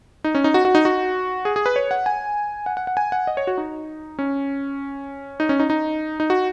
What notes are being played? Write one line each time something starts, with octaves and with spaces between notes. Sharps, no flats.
D#4
C#4
D#4
F#4
F#4
D#4
F#4
G#4
G#4
B4
C#5
F#5
G#5
F#5
F#5
F#5
G#5
F#5
D#5
C#5
F#4
D#4
C#4
D#4
C#4
D#4
D#4
D#4
F#4